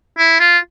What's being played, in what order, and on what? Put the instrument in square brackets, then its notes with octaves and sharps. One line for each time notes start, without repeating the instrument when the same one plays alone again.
[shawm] E4
F4